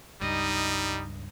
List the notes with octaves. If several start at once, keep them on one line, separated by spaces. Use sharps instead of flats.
C#2 G2 G3 D#4 D#5